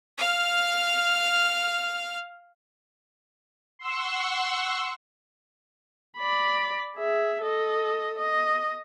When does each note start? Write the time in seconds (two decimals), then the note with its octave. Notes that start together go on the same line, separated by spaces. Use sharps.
0.19 F5 F6
3.79 F#5 C6 C#6 E6
6.18 D5 B5
6.96 G#4 E5
7.42 A4 D#5
8.18 D#5